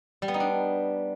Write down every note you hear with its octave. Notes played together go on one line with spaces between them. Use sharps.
G3
B3
D#4
D4